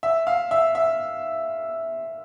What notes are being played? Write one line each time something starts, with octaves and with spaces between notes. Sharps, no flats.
E5
F5
E5
E5